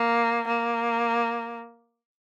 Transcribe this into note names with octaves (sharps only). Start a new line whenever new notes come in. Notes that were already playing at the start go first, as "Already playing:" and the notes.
Already playing: A#3
A#3